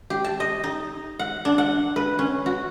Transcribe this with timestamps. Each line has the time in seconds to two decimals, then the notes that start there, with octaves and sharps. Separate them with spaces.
0.10 G4
0.24 A5
0.40 D#5
0.64 D#4
1.19 F#5
1.45 D4
1.58 F#5
1.96 B4
2.19 C#4
2.46 F#4